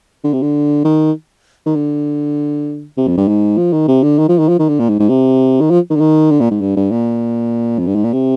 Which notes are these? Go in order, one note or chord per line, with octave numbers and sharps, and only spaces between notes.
D3
C3
D3
D#3
D#3
D3
C3
F2
G2
G#2
F3
D#3
C3
D3
D#3
F3
D#3
F3
D#3
D3
A#2
G#2
G#2
C3
D#3
F3
D#3
D3
D#3
D3
A#2
G#2
G2
G2
A#2
F2
G2
G#2
A#2
C3